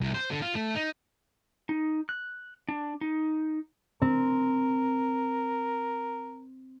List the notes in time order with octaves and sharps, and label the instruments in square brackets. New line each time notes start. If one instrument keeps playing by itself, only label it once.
[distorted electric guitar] C2
C5
D3
F4
A3
D#4
[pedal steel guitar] D#4
F#6
D4
D#4
[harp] C4 [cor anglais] A#4